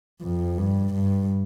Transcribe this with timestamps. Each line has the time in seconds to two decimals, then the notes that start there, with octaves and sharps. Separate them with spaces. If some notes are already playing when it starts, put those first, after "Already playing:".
0.22 F2
0.58 G2
0.94 G2